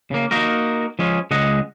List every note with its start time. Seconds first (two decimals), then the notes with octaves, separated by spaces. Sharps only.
0.11 C#3 A#3
0.31 A#3 D#4 F#4 A#4
0.99 F3 G#3 C#4
1.31 C#2 G#3 D#5 F#5